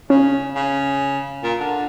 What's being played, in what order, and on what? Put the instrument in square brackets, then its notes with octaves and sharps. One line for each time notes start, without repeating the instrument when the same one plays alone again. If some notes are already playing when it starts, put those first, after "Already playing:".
[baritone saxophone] C#3 [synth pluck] C#4
[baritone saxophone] C#3
A#2
D3